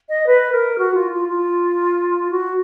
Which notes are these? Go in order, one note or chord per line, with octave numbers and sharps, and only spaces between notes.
D#5
B4
A#4
F#4
F4
F4
F4
F#4